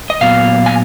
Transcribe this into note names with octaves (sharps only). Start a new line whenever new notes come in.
D#5
A#2 F#3 B3 F5
G#5